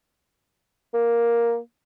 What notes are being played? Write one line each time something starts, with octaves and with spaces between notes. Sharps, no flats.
A#3